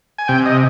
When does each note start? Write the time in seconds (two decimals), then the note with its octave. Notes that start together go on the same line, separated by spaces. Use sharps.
0.18 G#5
0.28 C3 G5
0.46 D#5